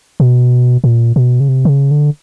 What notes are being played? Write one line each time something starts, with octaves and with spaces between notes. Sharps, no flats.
B2
A#2
B2
C#3
C3
D3
C#3
D3